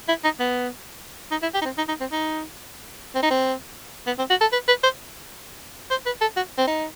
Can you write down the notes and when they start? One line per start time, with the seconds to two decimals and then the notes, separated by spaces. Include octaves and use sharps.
0.08 E4
0.24 D#4
0.40 B3
1.31 D#4
1.42 E4
1.54 G4
1.62 D#4
1.65 C4
1.78 D#4
1.89 D#4
2.00 C4
2.12 D#4
3.15 C4
3.23 D#4
3.30 C4
4.07 B3
4.18 C4
4.30 F#4
4.41 A4
4.53 B4
4.68 B4
4.83 C5
5.90 C5
6.06 B4
6.21 A4
6.36 F#4
6.58 C4
6.67 D#4